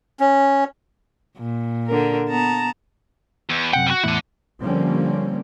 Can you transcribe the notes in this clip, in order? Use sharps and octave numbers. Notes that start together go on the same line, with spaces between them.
C#4
A#2
D3 A#4
B3 A5 A#5
E2
F#2 C3 F#5 G5
G3 F#4
E2 A2 D4 E4 F#5
D3 F3 G3 A#3 C4 C#4